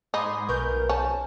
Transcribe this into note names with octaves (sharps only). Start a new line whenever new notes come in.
G#2 D#4 G#5 B5 C6 D6 D#6
B1 A#4 B4 C#6 G6
C#4 C5 G#5 A5